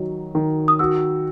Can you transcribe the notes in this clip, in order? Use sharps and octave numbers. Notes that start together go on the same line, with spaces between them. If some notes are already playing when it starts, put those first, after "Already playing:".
Already playing: D#3 F#3 D#4
D#3
D#6
F#4 E6